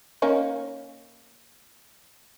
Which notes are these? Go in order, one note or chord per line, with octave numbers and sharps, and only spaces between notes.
A#3 C#4 D#4